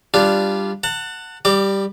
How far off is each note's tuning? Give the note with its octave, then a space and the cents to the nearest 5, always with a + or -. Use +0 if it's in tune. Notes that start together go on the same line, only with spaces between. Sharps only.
G3 +0 D4 +0 F4 -15
F#5 +0 A5 +35
G3 +0 D5 +35 D6 +0